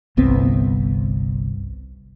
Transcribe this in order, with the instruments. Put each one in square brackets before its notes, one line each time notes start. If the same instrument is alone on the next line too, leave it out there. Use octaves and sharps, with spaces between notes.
[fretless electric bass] G1 C2 B3 C4